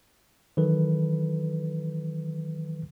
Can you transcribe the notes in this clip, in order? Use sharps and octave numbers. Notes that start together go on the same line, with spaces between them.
D#3 E3 F#3 A4 B4